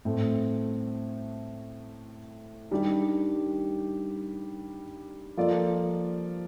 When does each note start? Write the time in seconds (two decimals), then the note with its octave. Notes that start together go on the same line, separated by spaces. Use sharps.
0.05 A2 A3 C4
2.71 D#3 G3 D4 G4
5.37 F3 A#3 F4 A4 D5